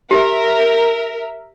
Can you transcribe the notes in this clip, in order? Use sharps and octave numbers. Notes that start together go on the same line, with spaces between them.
G4 A#4 E5